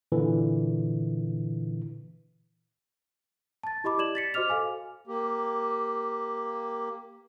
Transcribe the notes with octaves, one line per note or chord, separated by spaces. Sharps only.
A#2 D3 E3
A5 A6
E4 G4 D#5 B5 D6
G4 D5 G#6 E7 F#7
A6 B6 C#7
F#4 C5 D#5 D6 F6 F7
A4 F5 G#5 D6
A#3 G4